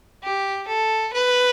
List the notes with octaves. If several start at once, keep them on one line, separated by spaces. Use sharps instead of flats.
G4
A4
B4